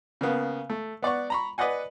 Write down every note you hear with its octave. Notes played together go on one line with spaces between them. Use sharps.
C#3 A#3 B3
A3
B3 D5 F#5 C#6
A#5 B5 C#6
B4 D5 D#5 F#5 G#5